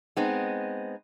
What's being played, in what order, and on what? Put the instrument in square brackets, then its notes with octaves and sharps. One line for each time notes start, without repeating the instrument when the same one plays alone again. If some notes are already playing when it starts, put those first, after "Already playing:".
[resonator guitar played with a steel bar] G#3 B3 C4 D#4